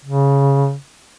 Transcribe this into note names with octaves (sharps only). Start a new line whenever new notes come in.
C#3